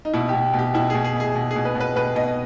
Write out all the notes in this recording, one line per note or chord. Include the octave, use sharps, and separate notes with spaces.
D#4
B2 E4
B2 G4
B2
G4
B2 E4
B2 G#4
G#4
B2 G#4
B2
G#4
B2
B4
B2
B4
B2 B4
B2 D#5